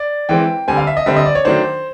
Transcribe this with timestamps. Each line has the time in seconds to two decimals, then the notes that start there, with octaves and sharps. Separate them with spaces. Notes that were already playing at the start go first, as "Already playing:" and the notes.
Already playing: D5
0.29 E3 G#3 C4 G5
0.68 D3 G3 C4 G#5
0.78 F5
0.87 E5
0.97 D#5
1.06 D3 G3 C4 E5
1.16 D#5
1.26 D5
1.35 C#5
1.45 D#3 F#3 A3 D4 C5